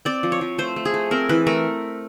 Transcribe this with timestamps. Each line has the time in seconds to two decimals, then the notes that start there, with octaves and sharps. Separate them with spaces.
0.05 C4 D5
0.23 F3
0.32 C#5
0.41 F3
0.58 A3 C5
0.76 A3
0.85 G#4
0.94 A3
1.11 C4 A#4
1.29 E3 B4
1.47 A3 A#4